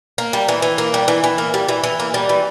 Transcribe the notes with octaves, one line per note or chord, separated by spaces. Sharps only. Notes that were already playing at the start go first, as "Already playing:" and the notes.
A#3
G3
E3
E3
A#3
G3
E3
E3
A#3
G3
E3
E3
A#3
G3
E3